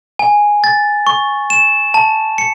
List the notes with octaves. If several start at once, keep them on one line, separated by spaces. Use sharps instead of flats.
G#5
A6
C#6
E7
A5
C#7